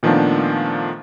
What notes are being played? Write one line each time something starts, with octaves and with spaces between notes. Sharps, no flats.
A#2 D#3 F3 A3 B3 D4